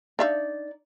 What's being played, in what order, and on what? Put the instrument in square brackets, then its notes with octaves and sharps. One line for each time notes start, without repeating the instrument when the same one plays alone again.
[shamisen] D4 E5 F5 [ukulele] D#4 D5